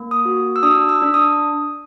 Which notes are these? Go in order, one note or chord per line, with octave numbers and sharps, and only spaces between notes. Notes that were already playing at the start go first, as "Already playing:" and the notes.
Already playing: A#3
D#6
F#4
E6
D4 D#6
E6
D4
D#6